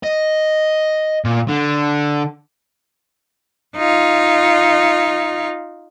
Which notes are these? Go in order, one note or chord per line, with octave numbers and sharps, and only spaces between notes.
D#5
A#2
D3
D#4 F4